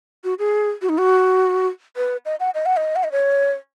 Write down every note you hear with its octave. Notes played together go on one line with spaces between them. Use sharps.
F#4
G#4
F#4
D#4
F#4
B4
D#5
F#5
D#5
F#5
D#5
F#5
D#5
C#5